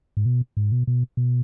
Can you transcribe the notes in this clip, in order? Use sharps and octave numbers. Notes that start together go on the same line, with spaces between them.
G#2
B2
G#2
B2
B2
B2